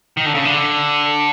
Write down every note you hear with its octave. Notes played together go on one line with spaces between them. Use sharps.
D#3
D3
C#3
D3